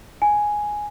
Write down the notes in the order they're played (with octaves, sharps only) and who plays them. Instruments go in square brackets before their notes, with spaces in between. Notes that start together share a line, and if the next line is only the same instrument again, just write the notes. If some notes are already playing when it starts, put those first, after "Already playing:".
[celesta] G#5